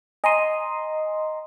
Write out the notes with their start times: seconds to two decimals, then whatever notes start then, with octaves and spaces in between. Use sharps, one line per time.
0.24 D#5 G#5 A#5 C6 D#7